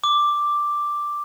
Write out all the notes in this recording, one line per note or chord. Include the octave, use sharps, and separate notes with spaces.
D6